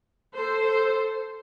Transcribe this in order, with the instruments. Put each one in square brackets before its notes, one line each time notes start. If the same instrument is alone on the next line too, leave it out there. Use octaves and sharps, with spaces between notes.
[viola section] A4 C5